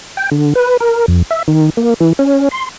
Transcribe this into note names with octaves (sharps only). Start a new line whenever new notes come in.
G5
D3
B4
A#4
F2
E5
D#3
A#3
E3
C#4
C6